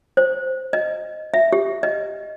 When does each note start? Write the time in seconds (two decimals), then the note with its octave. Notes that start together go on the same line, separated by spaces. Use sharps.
0.17 C5
0.73 D#5
1.34 E5
1.52 G4
1.83 D#5